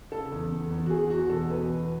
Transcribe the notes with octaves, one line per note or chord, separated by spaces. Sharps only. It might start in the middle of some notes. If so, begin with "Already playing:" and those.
C#3 A4
E2
E2
E2
F#4
E2 G#4
E2 F#4
B2 A4
E2 B4
E2